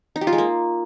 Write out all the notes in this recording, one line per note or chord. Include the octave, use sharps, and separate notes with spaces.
D#4
G4
F4
G#3
A#3